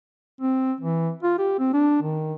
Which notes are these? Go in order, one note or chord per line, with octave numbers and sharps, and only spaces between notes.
C4
E3
F4
G4
C4
D4
D#3